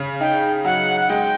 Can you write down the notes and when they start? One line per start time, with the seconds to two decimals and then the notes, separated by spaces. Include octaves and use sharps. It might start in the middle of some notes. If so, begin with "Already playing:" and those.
Already playing: C#3
0.20 D#4 G5
0.65 F#3 F#5
1.01 F#5
1.09 G#3 G5